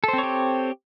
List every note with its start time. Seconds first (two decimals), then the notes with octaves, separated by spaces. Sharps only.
0.04 A4
0.08 C5
0.13 C4
0.18 C#5
0.23 G4